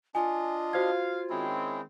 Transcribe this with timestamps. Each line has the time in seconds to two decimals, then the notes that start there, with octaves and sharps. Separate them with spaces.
0.15 D4 F4 D#5 G#5
0.73 F#4 C5 F5 G#6
1.30 D#3 G#3 C4 C#4 E4